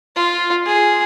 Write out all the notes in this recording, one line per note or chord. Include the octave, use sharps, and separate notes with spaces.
F4
G#4